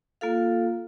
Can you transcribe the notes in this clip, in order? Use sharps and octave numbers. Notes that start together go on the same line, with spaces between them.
A#3 F4 A4 F5